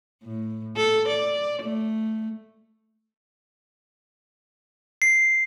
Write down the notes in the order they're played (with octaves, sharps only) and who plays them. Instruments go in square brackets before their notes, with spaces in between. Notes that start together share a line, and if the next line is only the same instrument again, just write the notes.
[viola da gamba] A2
A4
D5
A3
[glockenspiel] C7